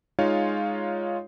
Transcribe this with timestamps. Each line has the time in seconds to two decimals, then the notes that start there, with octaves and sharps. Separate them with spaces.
0.19 G#3 D#4 F4 C#5 F5